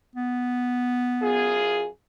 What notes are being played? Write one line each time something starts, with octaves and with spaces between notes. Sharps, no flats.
B3
F#2 F4 G#4